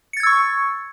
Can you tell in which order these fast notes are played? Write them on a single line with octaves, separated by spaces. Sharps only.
C#7 A6 G#6 E6 C#6